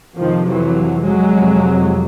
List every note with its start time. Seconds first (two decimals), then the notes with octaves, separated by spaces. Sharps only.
0.18 F2 C3 D#3 F3
0.46 E3 F#3
1.03 F#3 G#3
1.33 F2 C3